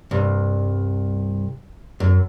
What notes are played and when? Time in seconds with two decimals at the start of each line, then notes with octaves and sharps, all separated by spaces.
0.11 C2 G2
2.00 F#2